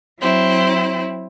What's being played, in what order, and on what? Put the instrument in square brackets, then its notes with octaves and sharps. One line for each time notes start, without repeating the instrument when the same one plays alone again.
[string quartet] F#3 C4 E4